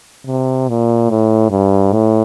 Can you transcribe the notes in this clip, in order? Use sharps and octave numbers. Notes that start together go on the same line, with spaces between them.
C3
A#2
A2
G2
A2